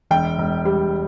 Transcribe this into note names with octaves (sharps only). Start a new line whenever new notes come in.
E1 G5
E1
G3